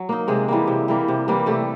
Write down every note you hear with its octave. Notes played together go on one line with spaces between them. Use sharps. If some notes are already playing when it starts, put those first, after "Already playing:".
Already playing: F#3
A#3 D#4
C3 G#3 G#4
E3 G3 A#3
C3
E3 G3 A#3
C3
E3 G3 A#3
C3 A3 A4